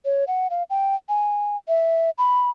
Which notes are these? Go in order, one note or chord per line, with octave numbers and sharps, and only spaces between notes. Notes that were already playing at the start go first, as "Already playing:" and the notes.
C#5
F#5
F5
G5
G#5
E5
B5